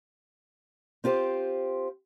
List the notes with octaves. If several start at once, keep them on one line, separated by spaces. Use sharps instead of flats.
C4 F4 G4 C5